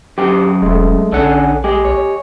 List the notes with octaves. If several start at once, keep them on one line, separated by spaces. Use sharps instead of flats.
F#2 G4 C5 G5
E1 G#3 A3
A#1 D3 C#4 A4 F#5 G#5
G#3 G4 D#5 G#5
C#5